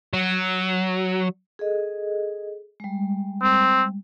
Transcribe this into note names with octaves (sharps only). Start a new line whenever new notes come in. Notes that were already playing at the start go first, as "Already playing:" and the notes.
F#3
G#4 A4 D#5
G3 G#3
C4